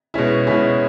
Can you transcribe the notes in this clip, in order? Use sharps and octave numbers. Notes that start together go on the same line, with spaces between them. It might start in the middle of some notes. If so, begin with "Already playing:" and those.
B2 G#3 C#4 E4
B2 G#3 C#4 E4